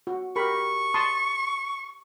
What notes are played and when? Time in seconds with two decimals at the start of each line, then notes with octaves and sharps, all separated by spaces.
0.07 F#4
0.36 G4 A#4 B5 C#6
0.94 A5 C6 D#6